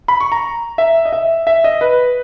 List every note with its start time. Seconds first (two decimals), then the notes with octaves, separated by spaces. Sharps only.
0.08 B5
0.20 C#6
0.32 A#5
0.78 E5
1.05 D#5
1.13 E5
1.47 E5
1.64 D#5
1.81 B4